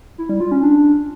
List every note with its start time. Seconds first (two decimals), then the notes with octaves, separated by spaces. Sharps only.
0.18 E4
0.29 G3
0.40 F4
0.51 C#4
0.63 D4